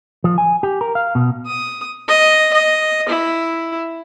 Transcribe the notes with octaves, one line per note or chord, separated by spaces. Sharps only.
F3
G#5
G4
A#4
F5
B2
D#6
D#5
D#5
E4